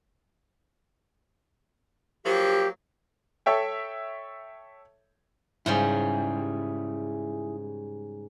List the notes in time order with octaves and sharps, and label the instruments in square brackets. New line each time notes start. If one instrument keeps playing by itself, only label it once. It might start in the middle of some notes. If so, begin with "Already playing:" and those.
[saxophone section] F3 F#3 A#3 [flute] G4
[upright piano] A4 C#5 E5 G5
[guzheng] G#2 C#3 G3 [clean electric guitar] E4 G#4